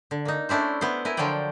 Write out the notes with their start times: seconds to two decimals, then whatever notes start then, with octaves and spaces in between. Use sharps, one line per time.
0.11 D3
0.25 A#3 D#4
0.49 A3 C#4 D4 E4 C5
0.81 B3 E4 C5
1.05 E4 A#4 G#5
1.17 D3 F3 F#3 C5 D5 G5